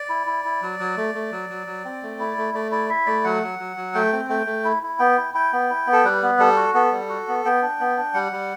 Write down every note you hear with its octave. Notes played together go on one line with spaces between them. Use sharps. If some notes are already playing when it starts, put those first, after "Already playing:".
Already playing: D5
E4
E4
E4
F#3
F#3
A3
A3
F#3
F#3
F#3
C4
A3
E4
A3
A3 D5
E4 D5
E4 E5
A3 D5
F#3 F#5
F#3
F#3
F#3
A3 G5
C4
A3 G5
A3
E4
E4
B3 G5
E4
E4 G5
B3
E4
B3
A4
G3 B4
B3
G3 A4
F#4
B3 A4
G3
F#4
B3
B3 G5
D4
B3
D4
G3 F#5
G3